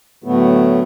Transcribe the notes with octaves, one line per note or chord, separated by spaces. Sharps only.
A2 D3 F#3 A3 B3